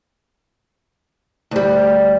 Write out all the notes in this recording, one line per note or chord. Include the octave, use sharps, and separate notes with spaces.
D2 G3